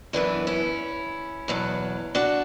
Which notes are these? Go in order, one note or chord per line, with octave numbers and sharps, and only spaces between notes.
F#2 E3 G3 B3 D4
C#4 E4
E2 B2 F#3
D4 F#4